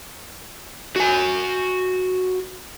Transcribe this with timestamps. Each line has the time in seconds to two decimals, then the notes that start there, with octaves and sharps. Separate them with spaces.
0.96 F#4 G#5